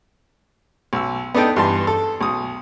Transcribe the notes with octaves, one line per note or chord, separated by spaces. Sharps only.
B1 E6
B3 D4 D#4 A4 G5
G2 E3 A5 C6
A4
B1 D#6